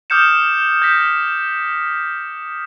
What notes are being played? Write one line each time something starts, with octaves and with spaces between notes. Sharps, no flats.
D6 D#6 F6 G6 C#7 E7
G6 A#6 B6